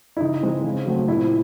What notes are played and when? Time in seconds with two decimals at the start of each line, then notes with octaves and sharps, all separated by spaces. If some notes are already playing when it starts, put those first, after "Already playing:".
0.17 E4
0.21 C#3 D#4
0.42 E3 G#3 C4
0.64 C#3
0.86 F#3 A3 C4
1.08 A#2 E4